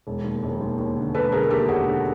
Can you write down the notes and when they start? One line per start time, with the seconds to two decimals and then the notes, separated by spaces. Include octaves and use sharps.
0.07 E1
0.24 D#2
0.43 E1
0.61 D#2
0.78 D#2
0.97 D3
1.14 E1 A4 B4
1.32 D3 G#4 A#4
1.50 D#2 G4 A4
1.68 E1 F#4 G#4
1.86 D3